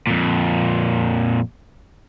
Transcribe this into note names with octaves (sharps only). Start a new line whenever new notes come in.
F2 A#2